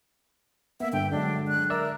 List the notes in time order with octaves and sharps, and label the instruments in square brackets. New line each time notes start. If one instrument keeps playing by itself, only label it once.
[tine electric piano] A#3 B3 [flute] E5
[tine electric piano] G2 D3 [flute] G5
[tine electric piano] D3 F#3 G#3 [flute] D4
[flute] F#6
[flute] A#4 [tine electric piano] D5 E5 E6